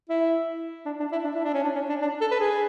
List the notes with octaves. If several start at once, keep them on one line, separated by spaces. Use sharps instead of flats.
E4
D4
D4
E4
D4
E4
D4
C#4
D4
C#4
D4
D4
A4
B4
G#4